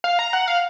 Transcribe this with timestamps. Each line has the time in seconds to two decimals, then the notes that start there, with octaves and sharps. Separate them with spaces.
0.04 F5
0.19 A#5
0.33 F#5
0.48 F5